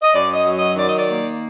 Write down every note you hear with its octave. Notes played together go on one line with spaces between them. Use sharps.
D#5
F#2 D5
D#5
F#3
D#5
D#3 D5
D#5
D5
A#3